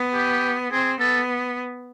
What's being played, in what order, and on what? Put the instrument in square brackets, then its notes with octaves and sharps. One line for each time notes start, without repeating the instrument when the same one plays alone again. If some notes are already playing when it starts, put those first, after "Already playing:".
Already playing: [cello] B3
[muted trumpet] G4
[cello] C4 [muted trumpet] G#4
[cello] B3 [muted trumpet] A4